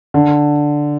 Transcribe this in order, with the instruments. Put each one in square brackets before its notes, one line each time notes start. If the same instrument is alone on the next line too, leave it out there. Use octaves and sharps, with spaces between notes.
[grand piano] D3